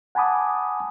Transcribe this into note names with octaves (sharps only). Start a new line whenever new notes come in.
F#5 G#5 A5 B5 D6 D#6